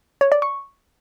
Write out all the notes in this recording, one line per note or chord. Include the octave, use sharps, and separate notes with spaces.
C#5
D5
C#6